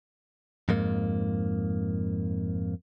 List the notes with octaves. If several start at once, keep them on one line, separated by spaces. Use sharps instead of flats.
F2 G#2 A#3